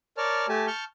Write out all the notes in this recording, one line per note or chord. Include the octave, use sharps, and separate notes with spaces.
A#4 C#5 D5 A5 F6
A3 G4 G#5 A5
A5 C#6 F6 G6